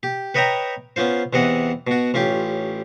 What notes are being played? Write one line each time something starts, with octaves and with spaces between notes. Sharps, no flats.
G4
B4 C#5 D#5 E5 G5 A#5
B3 C#4 F4 C5
E2 C3 E3 D#5 F#5
B2 F#4
A1 C#4 F4 G4